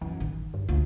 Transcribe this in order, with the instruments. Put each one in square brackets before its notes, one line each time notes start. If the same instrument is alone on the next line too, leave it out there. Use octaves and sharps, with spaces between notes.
[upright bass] F#2 [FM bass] E3
[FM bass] A1 [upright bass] D#3
[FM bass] G2
[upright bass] D2 [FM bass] F4